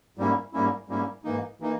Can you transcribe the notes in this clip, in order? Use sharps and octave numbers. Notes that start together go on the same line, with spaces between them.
G#2 G3 A#3 C#4 E4
G#2 G3 A#3 C#4 E4
G#2 G3 A#3 C#4 E4
G#2 E3 A#3 D#4
E3 A#3 D#4